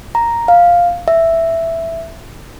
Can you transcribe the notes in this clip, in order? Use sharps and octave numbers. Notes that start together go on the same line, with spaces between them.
A#5
F5
E5